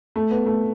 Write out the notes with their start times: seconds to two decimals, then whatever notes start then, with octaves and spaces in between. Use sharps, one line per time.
0.16 A3
0.31 B3
0.46 A3